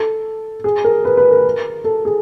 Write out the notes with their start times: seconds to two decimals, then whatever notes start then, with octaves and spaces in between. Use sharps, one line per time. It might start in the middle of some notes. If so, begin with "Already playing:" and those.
Already playing: A4
0.64 G#4
0.84 A#4
1.05 B4
1.17 B4
1.31 A#4
1.84 A4
2.05 G#4